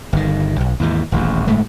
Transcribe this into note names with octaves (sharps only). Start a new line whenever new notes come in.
G1 D#3
B1
D#2 G#2 E3
D#1 A1 E2
G1 A2 G#3 A3